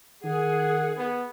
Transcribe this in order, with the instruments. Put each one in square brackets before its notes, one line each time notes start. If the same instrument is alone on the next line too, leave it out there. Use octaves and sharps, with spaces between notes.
[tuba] D#3 [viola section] G#4 [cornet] F#5
[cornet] B3